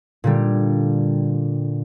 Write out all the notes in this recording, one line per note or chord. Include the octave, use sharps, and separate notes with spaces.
A#2 D3 G3